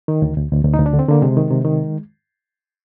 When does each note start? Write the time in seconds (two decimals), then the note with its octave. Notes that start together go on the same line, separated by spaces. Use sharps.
0.08 D#3
0.22 D2
0.37 D2
0.51 D2
0.65 D2
0.74 D#4
0.79 D2
0.86 D4
0.93 D3
0.99 C4
1.08 D3 A#3
1.22 C3 G#3
1.37 D#3
1.51 C3
1.65 D#3